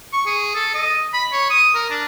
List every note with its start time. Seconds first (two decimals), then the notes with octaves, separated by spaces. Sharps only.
0.13 C#6
0.26 G#4
0.55 A4
0.74 D#5
1.13 B5
1.32 C#5
1.50 D#6
1.75 A#4
1.90 D4